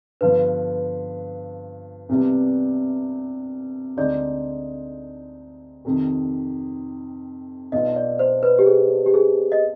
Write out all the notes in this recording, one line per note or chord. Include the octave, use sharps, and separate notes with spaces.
G2 D3 F3 B3 B4
C2 C3 G3 B3 D4
D2 D3 G#3 C4 D#4 D5
F2 C3 D#3
B1 B2 B3 D4 F4 D#5
D5
C5
B4
G4
G#4
G4
G#4
D#5